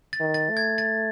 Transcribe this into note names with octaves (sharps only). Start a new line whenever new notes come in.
A6
D#3
A6
A3
G#6
A6